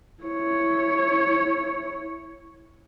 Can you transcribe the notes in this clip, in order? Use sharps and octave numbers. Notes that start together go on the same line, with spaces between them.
E4 C#5